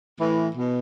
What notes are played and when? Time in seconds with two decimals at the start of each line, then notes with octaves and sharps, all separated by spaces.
0.19 A2 E3
0.55 B2